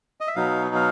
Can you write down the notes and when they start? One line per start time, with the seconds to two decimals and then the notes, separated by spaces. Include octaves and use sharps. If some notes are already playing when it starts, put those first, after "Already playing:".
0.21 D#5
0.27 E5
0.36 B2 F#3 B3 D#4 F5
0.75 F5